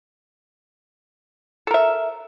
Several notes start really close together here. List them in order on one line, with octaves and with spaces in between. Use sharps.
A4 A#4 E5